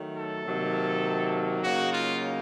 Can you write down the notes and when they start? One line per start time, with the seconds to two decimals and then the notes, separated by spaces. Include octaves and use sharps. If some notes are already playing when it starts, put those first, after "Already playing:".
Already playing: D#3 F#3 A3
0.15 A4
0.45 C3 D#3 F#3 A#3
1.62 C#3 F#3 A#3 D#4 F#4
1.92 F4